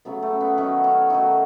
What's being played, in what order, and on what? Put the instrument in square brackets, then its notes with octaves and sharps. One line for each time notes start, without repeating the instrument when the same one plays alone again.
[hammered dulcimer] C#3 F#3 A3 B3
A3
B3
D#3 F#3 A3 C#4
C#4
D#3 F#3 A3 D#4